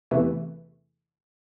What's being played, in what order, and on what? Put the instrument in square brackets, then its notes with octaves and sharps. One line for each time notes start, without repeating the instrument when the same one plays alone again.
[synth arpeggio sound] E2 C3 E3 A3